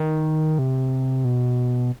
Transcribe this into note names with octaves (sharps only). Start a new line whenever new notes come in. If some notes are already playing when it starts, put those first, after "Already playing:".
Already playing: D#3
C3
B2